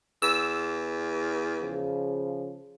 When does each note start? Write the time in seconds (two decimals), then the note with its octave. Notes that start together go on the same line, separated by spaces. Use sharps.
0.22 E2 E6
1.62 C#3 F3